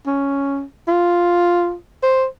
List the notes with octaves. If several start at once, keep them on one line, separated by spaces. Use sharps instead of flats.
C#4
F4
C5